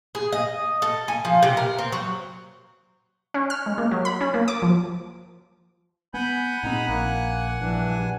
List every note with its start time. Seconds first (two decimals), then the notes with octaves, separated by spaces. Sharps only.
0.15 G#4
0.32 D#5
0.82 A4
1.08 G#5
1.25 F3
1.43 C3
1.57 A#4
1.79 C4
1.92 F#3
3.34 C#4
3.50 F6
3.66 G#3
3.78 A#3
3.91 F#3
4.05 B5
4.21 C#4
4.34 A#3
4.48 D6
4.62 F3
6.14 B3 F#5 G#5 B5 G6
6.63 A#2 C4 D#4 A#5 B5
6.88 A#1 A#3 F#6
7.60 A#1 G2 E3 D4